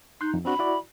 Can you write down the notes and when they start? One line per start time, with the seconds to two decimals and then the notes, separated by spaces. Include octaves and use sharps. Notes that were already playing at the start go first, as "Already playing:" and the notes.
0.21 D#4 C6 F#6 G6
0.34 F2
0.45 C4 D4 F#4 B5
0.59 E4 F#4 D5